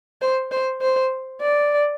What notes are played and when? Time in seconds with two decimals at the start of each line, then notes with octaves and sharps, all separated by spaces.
0.22 C5
0.51 C5
0.81 C5
1.41 D5